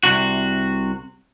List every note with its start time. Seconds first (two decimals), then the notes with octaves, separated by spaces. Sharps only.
0.03 C2 C3 F#4